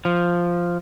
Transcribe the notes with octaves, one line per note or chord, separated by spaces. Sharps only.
F3